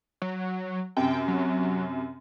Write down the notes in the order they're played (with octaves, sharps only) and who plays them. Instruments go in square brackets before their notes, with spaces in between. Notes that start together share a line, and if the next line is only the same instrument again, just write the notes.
[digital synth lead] F#3
[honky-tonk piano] F#2 C3 [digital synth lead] G5
[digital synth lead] F#3